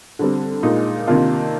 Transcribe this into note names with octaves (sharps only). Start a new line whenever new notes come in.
D3 G3 C4
A#2 G#3 D#4
C3 D#3 A#3 D4 F4